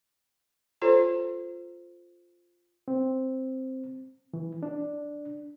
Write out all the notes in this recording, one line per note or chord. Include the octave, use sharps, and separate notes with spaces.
F4 A4 C5 C#5 A#5
C4
E3
D4